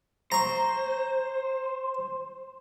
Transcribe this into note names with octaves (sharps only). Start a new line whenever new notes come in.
C5 A#5 C#6